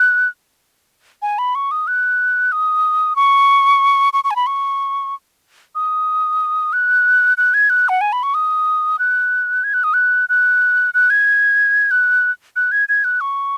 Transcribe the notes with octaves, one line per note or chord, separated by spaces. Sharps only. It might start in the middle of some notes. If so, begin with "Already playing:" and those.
Already playing: F#6
G#5
B5
C#6
D#6
F#6
D#6
C#6
C#6
C#6
G#5
B5
C#6
D#6
F#6
F#6
G#6
F#6
F#5
G#5
B5
C#6
D#6
F#6
G#6
F#6
D#6
F#6
F#6
F#6
G#6
F#6
F#6
G#6
G#6
F#6
C#6